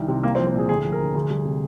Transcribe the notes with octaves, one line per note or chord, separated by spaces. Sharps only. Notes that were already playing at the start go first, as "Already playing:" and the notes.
Already playing: C2 D#3
C3
C2 A#3
C4
F3
C4
A#2 G#4
D2 G#4
F3
A#4
D3
D2 G#4
G3
C3